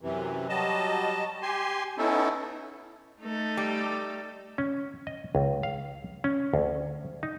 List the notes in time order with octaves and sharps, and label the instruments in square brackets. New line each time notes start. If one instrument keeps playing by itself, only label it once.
[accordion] F#2 C3 E3
F#3 G3 D#5 A5
G4 G#5 C6
B3 C#4 D#4 E4 A4
[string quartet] A3 D#4 A4
[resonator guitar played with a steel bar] G3
[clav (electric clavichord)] C#4
D#5
C#2
F5
C#4
D2
D#4